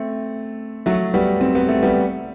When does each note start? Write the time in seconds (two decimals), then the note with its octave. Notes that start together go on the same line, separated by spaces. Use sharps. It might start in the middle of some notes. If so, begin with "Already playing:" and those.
Already playing: A3 C4
0.86 F#3 A3
1.14 G3 B3
1.41 C4
1.55 B3
1.68 A3
1.83 G3 B3